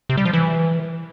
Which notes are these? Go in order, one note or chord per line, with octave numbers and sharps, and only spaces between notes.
C3
G3
F3
E3